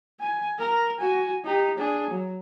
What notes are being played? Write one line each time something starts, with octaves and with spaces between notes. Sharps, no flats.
G#5
A#4
F#4 G#5
D#4 G4
D4 G#4
F#3